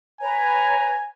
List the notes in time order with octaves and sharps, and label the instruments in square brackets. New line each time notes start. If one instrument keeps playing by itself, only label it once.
[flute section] B4 C#5 A#5 [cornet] G#5